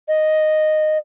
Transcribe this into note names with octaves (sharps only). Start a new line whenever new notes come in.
D#5